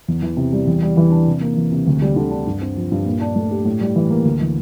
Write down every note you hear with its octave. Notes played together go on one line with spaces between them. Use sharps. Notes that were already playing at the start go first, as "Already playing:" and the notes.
E2
E3
C3
G3
E2
G3
E3
D4
C3
A#3
E3
C3
D2
G3
D3
D4
G2
C4
F3
G2
A#2
D4
A3
G4
A2
G3
E3
A#3
D2
E3